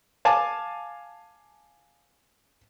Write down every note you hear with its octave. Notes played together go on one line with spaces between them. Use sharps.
F5 G#5 A5 D6